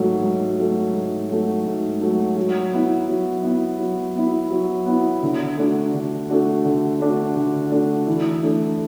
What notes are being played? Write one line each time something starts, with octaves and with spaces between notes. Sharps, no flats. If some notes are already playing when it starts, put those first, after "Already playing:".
Already playing: G#2 F#3 A3
G#2
F#3 A3
G#2
F#3 A3
G#2
F#3 A3
F#3
B3 E4
F#3
B3 E4
F#3
B3 E4
F#3
B3 E4
D3
A3 D4 F#4
D3
A3 D4 F#4
D3
A3 D4 F#4
D3
A3 D4 F#4
E3
A3 D4